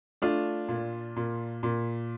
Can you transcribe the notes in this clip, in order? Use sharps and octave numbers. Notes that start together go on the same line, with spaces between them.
A3 D4 F4
A#2
A#2
A#2